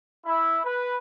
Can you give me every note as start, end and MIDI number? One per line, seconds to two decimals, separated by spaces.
0.25 0.57 64
0.64 0.96 71